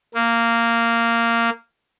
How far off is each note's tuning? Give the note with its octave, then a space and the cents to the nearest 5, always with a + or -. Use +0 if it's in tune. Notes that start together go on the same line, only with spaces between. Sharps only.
A#3 -10